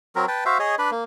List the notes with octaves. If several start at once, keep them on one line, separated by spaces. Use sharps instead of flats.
F#3 C4 A#4
B4 G5 A5
F#4 C5 E5 F5
G#4 C#5 D#5
D4 B4 B5
A#3